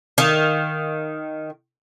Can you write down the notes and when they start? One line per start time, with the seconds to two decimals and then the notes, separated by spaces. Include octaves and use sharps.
0.18 D#3 F5